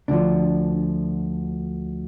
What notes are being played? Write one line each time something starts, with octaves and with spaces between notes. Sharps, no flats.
D2 D3 F3 D4